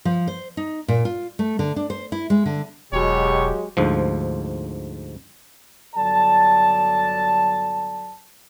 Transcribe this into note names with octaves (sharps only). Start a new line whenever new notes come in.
F3
C5
D#4
A#2
F4
A3
D3
D4
C5
E4
G#3
D3
E1 B2 F#3 G#3 G4 C#5
D2 G#2 F3
G1 F#3 A4 D5 A5